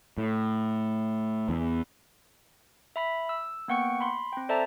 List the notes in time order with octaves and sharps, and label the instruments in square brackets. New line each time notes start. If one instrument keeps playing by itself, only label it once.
[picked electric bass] A2
E2
[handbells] E5 B5 B6
E6
A#3 B3 F#5 G5 C#6 C#7
B5 C6
C4 G5
A4 C5 D5 E5 A5 A#5